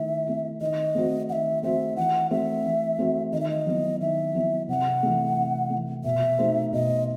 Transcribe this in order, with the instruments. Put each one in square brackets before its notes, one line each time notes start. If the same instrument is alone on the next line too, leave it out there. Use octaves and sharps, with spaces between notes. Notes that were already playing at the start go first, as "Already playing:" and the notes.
Already playing: [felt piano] D#3 A3 E4 [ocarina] E5
[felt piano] A3 E4
[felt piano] D#3 [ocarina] D#5
[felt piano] A3 C4 F#4 C5
[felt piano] D#3 [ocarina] F#5
[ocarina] E5
[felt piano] A3 C4 F#4 C5 [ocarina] E5
[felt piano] E3 [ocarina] F#5
[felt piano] A3 C4 F#4 [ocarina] E5
[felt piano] E3
A3 C4 F#4
[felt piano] D#3 [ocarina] D#5
[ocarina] E5
D#5
[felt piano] F#3 B3 E4
[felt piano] D#3 [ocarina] E5
[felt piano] F#3 B3 E4
[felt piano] C3 [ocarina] F#5
[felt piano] E3 A3
C3
E3 A3
[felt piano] B2 [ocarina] E5
[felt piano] A3 D#4 F#4 C5
[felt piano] B2 [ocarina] D#5